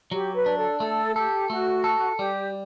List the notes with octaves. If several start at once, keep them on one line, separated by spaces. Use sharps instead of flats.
F#3 G4
B4
D4
A4
A3 A4
G4 A4
A3 F#4
A4
G3 G4